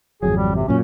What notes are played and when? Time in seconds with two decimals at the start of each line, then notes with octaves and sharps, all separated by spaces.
0.23 G#1 F2 F#3 G#4
0.37 G3
0.56 C3
0.68 F#2 A#2 F#3 C#4